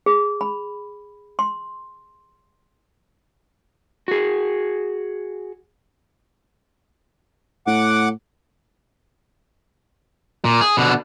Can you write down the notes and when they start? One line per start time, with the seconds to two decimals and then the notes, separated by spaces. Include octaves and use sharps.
0.06 G#4
0.41 B5
1.39 C6
4.08 F#4 G#4
7.67 A2 F#5 D6
10.45 A#2
10.61 G#4
10.77 B2 D3